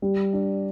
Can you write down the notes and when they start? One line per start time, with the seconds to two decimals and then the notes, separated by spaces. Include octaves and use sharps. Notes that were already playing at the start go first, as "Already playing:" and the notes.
0.02 G3
0.33 D4